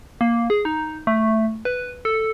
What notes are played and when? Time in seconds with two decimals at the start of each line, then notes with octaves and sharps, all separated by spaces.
0.21 A#3
0.50 G#4
0.65 D#4
1.07 A3
1.65 B4
2.05 A4